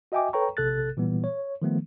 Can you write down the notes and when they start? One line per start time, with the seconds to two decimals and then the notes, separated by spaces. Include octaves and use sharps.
0.12 F#4 D#5 E5 G5 G#5 D6
0.33 A4 B4 C#5 G5 A#5 C#6
0.57 A#1 C3 A4 F#6 A6
0.97 A#2 E3 G3 B3
1.24 C#5
1.62 D#3 F3 A3 B3